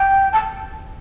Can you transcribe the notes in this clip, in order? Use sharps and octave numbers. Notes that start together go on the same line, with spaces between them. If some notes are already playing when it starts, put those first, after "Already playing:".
Already playing: G5
A5